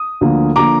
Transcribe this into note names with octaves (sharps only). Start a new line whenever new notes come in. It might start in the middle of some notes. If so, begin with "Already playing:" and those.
Already playing: D#6
D2 D3 F3 A#3
D3 F3 A#3 A#5 D6